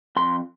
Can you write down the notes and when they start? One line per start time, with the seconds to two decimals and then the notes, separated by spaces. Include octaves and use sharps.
0.16 F2 C6